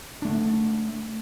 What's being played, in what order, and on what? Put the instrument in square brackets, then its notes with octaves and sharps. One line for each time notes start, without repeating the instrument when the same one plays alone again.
[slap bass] A3 D4